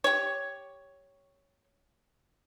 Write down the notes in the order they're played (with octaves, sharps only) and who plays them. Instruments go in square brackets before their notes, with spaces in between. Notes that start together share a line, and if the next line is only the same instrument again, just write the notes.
[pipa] G4 C#5